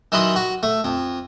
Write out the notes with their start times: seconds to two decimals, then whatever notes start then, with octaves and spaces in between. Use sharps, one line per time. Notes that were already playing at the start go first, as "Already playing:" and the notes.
0.12 D#3 E3 F#3 B4 C6 D#6
0.36 F#4
0.63 A3
0.84 F2